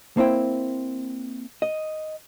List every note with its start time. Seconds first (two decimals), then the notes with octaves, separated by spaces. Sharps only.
0.17 A#3 C4 E4 G5
1.62 D#5